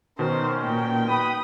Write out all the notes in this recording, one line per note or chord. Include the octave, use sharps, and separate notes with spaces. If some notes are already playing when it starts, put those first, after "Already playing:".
B2 D#3 C#4 A#4 C5
A#2 G5
F#4 B4 B5 D#6